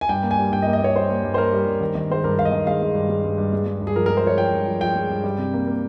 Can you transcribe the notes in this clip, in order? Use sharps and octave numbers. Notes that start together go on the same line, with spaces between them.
G#5
G2 G5
A#3
G#5
G3
G2 G5
D#5
A#3
D#5
A#3 C#5
G3 C5
A#3
G2
C5
A#3 A#4
G3
G2
D#3
D#3
G#3 C5
G2 A#4
G2 F5
D#5
D#3
G#3 F5
G#3
G2
G#3
G2
G2
G#3
G#3
G2
G#4
F3 A#4
A#4
G#3
C5
F3 C#5
F3 G5
G2
F3
F3 G5
G#3
G2
G3
C3
A#3
A#3